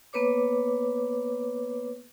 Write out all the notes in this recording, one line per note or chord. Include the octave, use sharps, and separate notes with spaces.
A#3 B3 B4 C#5 D6